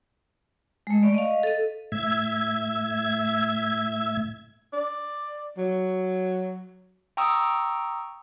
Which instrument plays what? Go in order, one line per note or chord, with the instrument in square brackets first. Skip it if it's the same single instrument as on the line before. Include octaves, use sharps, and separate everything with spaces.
[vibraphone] G#3 A3
D5 C#6
D#5 F5
A4 D#5
[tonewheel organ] A2 E5 G#6
[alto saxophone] D5
F#3
[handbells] G5 A#5 C#6 D#6 E6